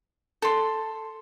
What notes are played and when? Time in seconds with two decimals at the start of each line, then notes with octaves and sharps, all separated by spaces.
0.42 A4 C6